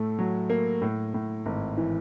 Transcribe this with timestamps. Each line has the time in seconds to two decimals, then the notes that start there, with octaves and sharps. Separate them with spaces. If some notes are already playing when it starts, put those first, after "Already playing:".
Already playing: A2 A3
0.19 F#3
0.50 A#3
0.82 A2
1.14 A2
1.46 G#1
1.78 E3